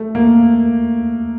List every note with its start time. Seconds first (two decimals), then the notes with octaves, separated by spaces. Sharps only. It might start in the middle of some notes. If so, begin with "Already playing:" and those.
Already playing: A3
0.15 A#3